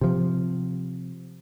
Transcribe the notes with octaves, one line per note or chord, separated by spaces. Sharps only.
C3 F3